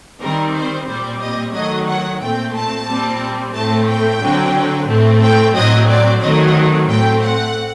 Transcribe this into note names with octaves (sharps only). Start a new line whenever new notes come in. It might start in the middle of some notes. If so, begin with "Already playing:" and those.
D#3 G3 C4 A#4
C5
A#2 G3 C4 C5
D#5
D#3 F#3 A3 D#5
F#5
A#2 A3 C4 G5
A5
A#2 G3 C4
A2 A3 C4 A5
G5
D3 F#3 C4
A2 A3 C4
G5
A2 F#3 C4 D#5
D5
D#3 F#3 A3 C4 D#5
A2 A3 C4 G5
F#5